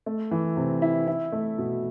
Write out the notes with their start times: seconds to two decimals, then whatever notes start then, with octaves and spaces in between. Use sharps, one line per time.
0.06 A3
0.31 E3
0.57 C3
0.82 E4
1.07 E4
1.32 A3
1.58 B2